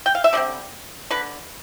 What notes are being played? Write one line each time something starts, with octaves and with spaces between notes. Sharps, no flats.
G5
F5
E5
D3 G3 C4 D5
D3 B4